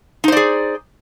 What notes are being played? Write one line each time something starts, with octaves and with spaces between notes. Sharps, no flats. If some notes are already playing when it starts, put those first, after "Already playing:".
D#4 G#4 C5 D5